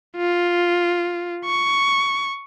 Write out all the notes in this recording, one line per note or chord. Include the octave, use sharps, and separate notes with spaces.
F4
C#6